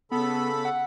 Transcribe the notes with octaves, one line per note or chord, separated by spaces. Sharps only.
C#3 B3 A4 B5
F#5